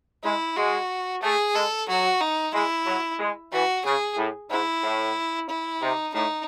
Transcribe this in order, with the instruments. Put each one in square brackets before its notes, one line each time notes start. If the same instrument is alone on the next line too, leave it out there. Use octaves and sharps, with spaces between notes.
[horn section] G#3 [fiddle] E4
[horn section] G#3 [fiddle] F#4
[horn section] A3 [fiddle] G#4
[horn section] G#3 [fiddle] A4
[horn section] F#3 [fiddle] F#4
[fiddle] D#4
[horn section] G#3 [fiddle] E4
[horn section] F#3
G#3
[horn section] E3 [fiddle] F#4
[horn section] C#3 [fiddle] G#4
[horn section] A2
[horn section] G#2 [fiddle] E4
[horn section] A2
[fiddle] E4
[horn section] C3 [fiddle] D#4
[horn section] A2 [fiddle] D#4